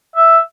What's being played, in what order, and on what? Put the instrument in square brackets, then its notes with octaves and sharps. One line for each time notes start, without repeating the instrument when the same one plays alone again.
[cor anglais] E5